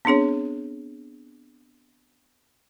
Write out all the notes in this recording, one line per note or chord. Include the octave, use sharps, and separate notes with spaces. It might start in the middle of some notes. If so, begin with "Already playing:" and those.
B3 C4 D4 G#4 C#5